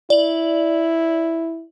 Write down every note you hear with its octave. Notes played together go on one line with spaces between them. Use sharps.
E4 D5 F#7